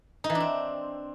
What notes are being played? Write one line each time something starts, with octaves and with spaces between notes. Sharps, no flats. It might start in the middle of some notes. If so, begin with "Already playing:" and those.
D#4
E3
D4
C4